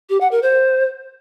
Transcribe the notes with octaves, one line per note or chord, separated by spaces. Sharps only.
G4
F#5
A#4
C5